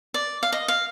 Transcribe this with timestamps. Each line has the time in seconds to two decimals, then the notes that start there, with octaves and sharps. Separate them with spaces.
0.14 D5
0.43 F5
0.52 D#5
0.68 F5